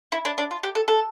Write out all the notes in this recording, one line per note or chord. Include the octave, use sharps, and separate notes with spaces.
E4
D4
D4
F4
G4
A4
A4